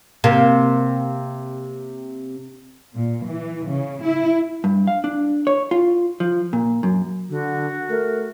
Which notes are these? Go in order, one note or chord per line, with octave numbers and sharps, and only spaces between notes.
C3 A#3
A#2
E3
C#3
E4
G2
F5
D4
C#5
F4
F3
A#2
F#2
D3 F#4
A3 A#4